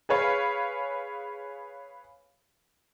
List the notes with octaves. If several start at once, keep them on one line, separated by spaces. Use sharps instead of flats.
G#4 B4 C#5 F5